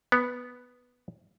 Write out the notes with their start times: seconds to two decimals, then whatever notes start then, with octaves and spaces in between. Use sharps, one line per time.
0.12 B3